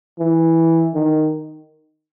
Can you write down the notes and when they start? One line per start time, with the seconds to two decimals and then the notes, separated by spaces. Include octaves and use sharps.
0.19 E3
0.95 D#3